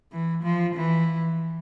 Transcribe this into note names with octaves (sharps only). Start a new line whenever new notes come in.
E3
F3
E3